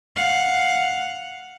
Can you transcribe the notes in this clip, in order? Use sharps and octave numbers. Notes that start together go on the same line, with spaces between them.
F5 F#5